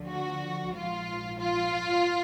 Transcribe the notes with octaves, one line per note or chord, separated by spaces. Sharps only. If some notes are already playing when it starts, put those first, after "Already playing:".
Already playing: D2 D3 F3
F#4
A#1 G#2 F3 F4
F4